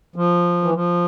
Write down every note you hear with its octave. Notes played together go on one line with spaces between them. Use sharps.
F3
E3
F3